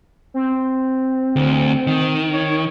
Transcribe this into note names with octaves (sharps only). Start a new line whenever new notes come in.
C4
D2
D#3
C#5